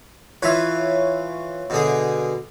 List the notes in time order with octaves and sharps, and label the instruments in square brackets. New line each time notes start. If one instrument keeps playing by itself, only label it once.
[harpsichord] E3 F4 B4 [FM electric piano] C#5 E5
[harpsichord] B2 D3 G#4